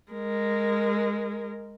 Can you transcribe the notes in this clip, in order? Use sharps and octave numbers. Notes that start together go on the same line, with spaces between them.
G#3 A#4